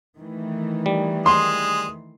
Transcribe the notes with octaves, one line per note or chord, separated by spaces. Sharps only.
D#3 E3 A3
G3
G#3 C6 D#6